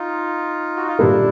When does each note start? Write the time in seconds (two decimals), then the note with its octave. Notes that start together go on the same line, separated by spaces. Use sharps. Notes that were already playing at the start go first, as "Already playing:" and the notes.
Already playing: D#4 F4
0.76 F#4
0.87 F4
0.99 A#2 G3 A#3 D4 E4